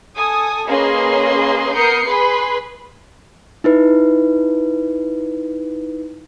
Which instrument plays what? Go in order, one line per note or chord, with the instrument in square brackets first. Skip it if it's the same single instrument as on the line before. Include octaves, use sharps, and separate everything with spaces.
[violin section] A4 G#5 D#6
A#3 C#4 G#4 B4 D#5 C6
B3 A#4 D#6 G6 C7 C#7
G#4 B4 B5 C6
[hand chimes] D#4 E4 B4